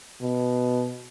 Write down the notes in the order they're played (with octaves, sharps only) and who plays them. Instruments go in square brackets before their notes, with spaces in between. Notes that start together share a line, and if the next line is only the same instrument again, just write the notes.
[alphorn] B2